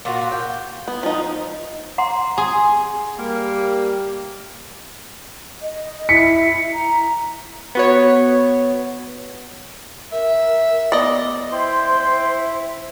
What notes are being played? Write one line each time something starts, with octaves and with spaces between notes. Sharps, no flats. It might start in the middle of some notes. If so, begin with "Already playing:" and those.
A#2 F4 F#4
G5
B3
F3 D#4
F#5 A#5 C6
G#4 C6
G3 A#3
D#5
E4 B6 C#7
A#5
B3 F#4 C#5
A#4 E5
B3 D5 D#5
E4 C5 G5 C6